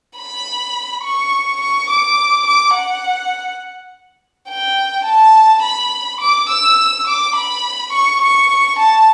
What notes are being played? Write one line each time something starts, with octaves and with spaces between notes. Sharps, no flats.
B5
C#6
C#6
D6
D6
F#5
G5
A5
B5
D6
E6
D6
B5
C#6
C#6
A5